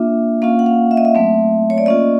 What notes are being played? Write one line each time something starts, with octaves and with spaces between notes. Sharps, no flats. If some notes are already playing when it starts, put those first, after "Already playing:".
Already playing: A#3 D4 F4 E5
A#3 C#4 F4 F5
F#5
F5
E5
D#5
E5
F#3 A3 C4
C#5
D5
A#3 C#4 F4 D#5